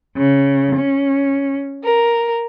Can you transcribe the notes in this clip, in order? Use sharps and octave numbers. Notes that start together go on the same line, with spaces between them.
C#3
C#4
A#4